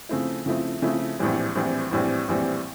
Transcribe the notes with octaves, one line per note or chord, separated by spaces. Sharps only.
C#3 F3 A3 C4 E4
C#3 F3 A3 C4 E4
C#3 F3 A3 C4 E4
A#1 A2 E3 G3 C4
A#1 A2 E3 G3 C4
A#1 A2 E3 G3 C4
A#1 A2 E3 G3 C4